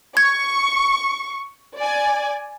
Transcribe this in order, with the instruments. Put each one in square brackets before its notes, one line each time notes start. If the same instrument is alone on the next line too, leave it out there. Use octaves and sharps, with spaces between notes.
[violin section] C#6 [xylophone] G#6
[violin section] D5 G#5